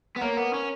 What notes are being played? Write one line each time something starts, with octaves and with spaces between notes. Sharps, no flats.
B3
A#3 A#4 C#5
B3
C#4